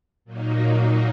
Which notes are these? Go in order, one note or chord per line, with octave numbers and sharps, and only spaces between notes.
A#2 F#3 A#3 D#4